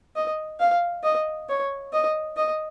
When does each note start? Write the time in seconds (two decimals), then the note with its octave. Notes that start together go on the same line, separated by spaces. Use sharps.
0.16 D#5
0.60 F5
1.04 D#5
1.49 C#5
1.93 D#5
2.37 D#5